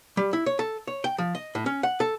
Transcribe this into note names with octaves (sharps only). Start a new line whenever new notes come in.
G3
E4
C#5
A4
C#5
G5
F3
D#5
A2
C#4
F#5
A4